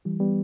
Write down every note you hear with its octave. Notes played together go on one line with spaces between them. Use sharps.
E3 G3
G3 B3